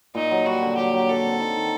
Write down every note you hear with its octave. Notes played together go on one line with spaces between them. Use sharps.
A#2 D#4
F#3
G3 F#4
D3
F#3 G4
F#3
F#4 A4
C4
D#4
D#3